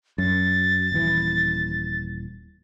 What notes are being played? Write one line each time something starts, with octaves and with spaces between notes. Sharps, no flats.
F#2 A6
D#1 E3